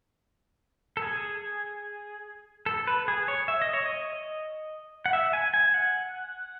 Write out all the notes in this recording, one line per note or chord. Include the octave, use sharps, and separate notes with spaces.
A4
G#4
A4
B4
G#4
C#5
E5
D#5
C#5
D#5
F#5
E5
G#5
G#5
F#5